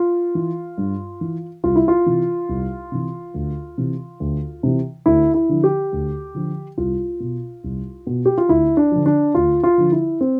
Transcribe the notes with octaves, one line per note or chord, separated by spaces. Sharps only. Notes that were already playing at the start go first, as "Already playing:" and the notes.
Already playing: F4
E3
G2
E3
C2 F4
E4
F4
C3 E3
C2
C3 E3
D2
C3 E3
D2
C3 E3
D2 E4
E4
D3 F3
G4
D2
D3 F3
C2 F4
B2
C2
B2
G4
F4
D2 E4
D4
D3 F3
D4
D2 F4
F4
D3 F3
E4
C4